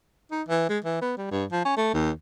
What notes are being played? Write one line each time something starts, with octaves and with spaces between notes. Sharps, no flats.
D#4
E3
G#3
E3
B3
G3
G2
F3
C#4
A3
D#2